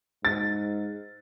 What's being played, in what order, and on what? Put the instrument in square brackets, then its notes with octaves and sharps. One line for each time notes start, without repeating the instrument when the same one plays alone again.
[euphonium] G#2 [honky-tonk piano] A6